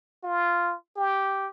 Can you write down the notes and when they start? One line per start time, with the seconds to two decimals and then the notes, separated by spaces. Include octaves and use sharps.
0.24 F4
0.96 G4